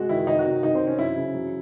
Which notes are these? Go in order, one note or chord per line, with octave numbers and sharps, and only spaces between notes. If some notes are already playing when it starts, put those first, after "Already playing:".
Already playing: C3 G#3 F#4
D#3 E4
D#3 D#4
F#4
C3
D#3 D#4
C4
C3
C#4
F#3 E4
C#3
F#3